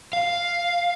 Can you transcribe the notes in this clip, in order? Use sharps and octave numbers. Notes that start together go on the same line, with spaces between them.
F5